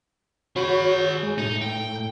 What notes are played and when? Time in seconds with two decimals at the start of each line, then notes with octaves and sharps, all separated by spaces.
0.56 F#4 G#4 C#5 B5
1.23 G#3
1.38 A2 D#4
1.62 G5